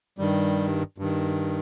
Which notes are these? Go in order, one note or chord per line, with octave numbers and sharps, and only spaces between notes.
G2 D#3 G3
G2 D#3